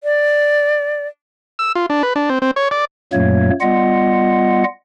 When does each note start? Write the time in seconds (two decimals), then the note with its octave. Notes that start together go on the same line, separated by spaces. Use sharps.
0.04 D5
1.59 E6
1.75 F4
1.90 D4
2.03 B4
2.16 D4
2.29 C4
2.42 C4
2.56 C#5
2.71 D5
3.13 F#2 A#2 F#3 A3 A#3 C#5
3.61 G3 B3 F4 D#5 F#5